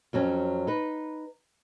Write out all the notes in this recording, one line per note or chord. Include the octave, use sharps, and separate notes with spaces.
F2 F#3 C4 C#4
D#4 B4